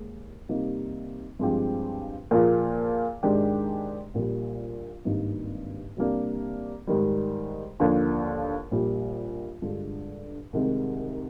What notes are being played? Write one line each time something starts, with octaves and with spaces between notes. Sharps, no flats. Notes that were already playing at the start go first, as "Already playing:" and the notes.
Already playing: D#2 G#3
C3 G3 A#3 D#4
G2 F3 G#3 C4 G4
A#2 F3 A#3 F4 G#4
G#2 D#3 G#3 D4 G4
A#1 A#2 G3
G#1 G2 D#3 A#3 D#4
C3 G3 A#3 D4
G#2 D#3 G3
D#2 D3 F3
A#1 A#2 G3
G2 D3 G#3 D4 F4
C2 C3 D#3 G#3 D#4